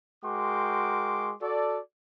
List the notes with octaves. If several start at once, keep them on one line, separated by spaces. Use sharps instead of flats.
G#3 F#4 A#4 G5 C6 D6
F#4 A4 D5